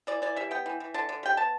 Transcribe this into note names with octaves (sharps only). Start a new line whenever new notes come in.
E3 D5
E3 D5
G3 E5
B3 G5
E3
E3
D3 A5
D3
G3 G5
B3 A5